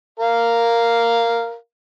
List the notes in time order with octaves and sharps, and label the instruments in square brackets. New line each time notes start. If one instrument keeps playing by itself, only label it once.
[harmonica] A#4 F5